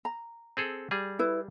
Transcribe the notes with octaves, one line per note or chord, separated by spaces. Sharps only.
A#5
C4 G#4 A4
G3 G#4
E4 B4